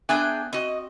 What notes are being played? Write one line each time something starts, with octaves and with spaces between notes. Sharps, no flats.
B3 D4 G#4 E5 G5 G#5
C4 F#4 D#5